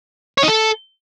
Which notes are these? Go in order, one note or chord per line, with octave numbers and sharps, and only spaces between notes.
C#5
D#4
A4